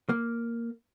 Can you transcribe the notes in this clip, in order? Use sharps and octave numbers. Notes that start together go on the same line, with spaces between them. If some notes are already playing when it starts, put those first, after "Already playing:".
A#3